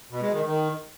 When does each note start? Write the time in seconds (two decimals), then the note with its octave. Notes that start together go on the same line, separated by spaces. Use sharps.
0.10 B2
0.22 G#3
0.33 D#3
0.44 D#3